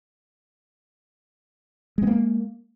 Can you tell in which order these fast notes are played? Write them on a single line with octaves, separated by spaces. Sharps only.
G#3 B3 A#3